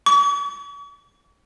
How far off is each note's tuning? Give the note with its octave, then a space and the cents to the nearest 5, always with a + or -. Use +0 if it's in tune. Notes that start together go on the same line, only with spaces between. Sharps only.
C#6 +45